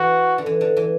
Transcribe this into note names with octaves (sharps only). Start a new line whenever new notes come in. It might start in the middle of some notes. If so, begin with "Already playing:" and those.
Already playing: E3 F#4
D3
E3
D3
E3